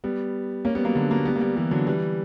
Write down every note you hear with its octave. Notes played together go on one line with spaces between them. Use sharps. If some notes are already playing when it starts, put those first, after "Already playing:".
G3 B3
A#3 C#4
G3 B3
F#3 A#3
D3 F#3
F#3 A#3
G3 B3
A#3
G3 B3
E3 G3
D3 F#3
E3 G3